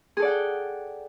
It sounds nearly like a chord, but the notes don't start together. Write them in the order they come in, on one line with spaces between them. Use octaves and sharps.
G#4 A4 D5 F#5 G5